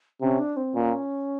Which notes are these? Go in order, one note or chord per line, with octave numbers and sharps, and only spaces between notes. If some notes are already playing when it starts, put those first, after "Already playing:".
C3 C#4
D4
C4
A#2 C#4